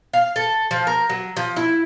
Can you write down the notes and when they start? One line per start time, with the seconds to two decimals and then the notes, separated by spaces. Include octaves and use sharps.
0.13 F5
0.36 A4
0.71 F3
0.87 A#4
1.10 F#3
1.37 F3
1.56 E4